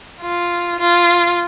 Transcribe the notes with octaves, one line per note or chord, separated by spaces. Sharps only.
F4
F4